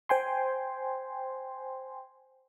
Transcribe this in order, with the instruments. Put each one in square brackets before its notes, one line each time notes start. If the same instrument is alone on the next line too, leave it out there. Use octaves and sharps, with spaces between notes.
[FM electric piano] C5 G5 G#5 C6